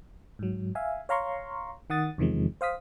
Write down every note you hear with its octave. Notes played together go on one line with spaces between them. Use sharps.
G#2 F#3
E5 F5 G#5
C#5 F5 A#5 C6 C#6
D#3 F#5 D#6 A6
E2 C3 D#3 F3 G#3
C5 F5 D#6 B6